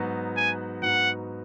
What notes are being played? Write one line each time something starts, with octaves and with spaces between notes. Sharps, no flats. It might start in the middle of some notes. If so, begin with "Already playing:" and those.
Already playing: G#2 F#3 B3 D#4 F#4
G#5
G#2 F#3 B3 D#4 F#4 F#5